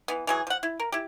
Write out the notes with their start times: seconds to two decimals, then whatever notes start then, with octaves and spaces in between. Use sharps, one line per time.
0.08 E3 B3
0.27 E3 F#3 G#4
0.47 F3 F#5
0.63 E4
0.80 A#4
0.92 E4 G4